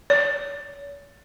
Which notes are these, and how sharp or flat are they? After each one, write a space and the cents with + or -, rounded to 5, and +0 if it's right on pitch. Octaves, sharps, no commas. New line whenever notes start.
C#5 +40